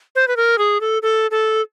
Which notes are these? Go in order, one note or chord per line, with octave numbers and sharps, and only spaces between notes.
C5
B4
A#4
G#4
A4
A4
A4